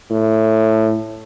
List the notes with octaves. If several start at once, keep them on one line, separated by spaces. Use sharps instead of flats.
A2